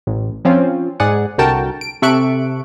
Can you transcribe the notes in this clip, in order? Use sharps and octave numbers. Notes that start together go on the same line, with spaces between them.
A1
F3 C4 C#4 F4
G#2 G#4 D5 F#5
C2 D3 F#4 A#4 G5 A5
D7
C3 A4 E5 C#6 F#6 D7